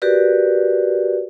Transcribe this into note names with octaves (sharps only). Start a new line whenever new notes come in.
F#4 G4 A#4 B4 D5